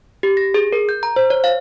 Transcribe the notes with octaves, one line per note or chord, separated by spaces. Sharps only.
G4
A#6
G#4
A#4
G6
A#5
C5
C#5
F5